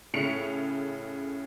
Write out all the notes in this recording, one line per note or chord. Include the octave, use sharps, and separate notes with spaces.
A2 C#3 B6 C#7 F7